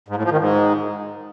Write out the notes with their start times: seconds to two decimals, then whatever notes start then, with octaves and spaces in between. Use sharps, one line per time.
0.08 G#2
0.16 A2
0.23 F3
0.31 D#3
0.38 G#2